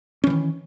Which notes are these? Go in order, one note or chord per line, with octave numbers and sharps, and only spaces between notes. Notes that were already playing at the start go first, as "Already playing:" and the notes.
D#3 E3 C#4